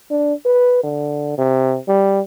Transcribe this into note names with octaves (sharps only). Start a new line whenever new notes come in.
D4
B4
D3
C3
G3